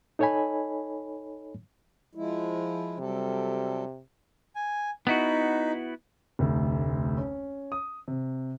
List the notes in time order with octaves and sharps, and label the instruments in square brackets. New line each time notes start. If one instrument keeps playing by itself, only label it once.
[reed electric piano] D#4 A4 C#5 D#5 G#5 B5
[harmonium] F3 G#3 E4
[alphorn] C3 [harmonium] F#3 G3 A4
[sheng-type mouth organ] G#5
[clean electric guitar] B3 E4 F#4 [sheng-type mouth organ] D#4
[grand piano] F1 D2
C#4
D#6
C3